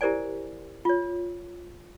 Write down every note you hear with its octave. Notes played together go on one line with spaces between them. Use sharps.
E4 G4 A#4 C5 D5 G#5
F4 C#5